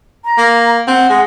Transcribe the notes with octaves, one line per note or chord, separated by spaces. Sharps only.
A#5
A#3
C4 F#5
G#3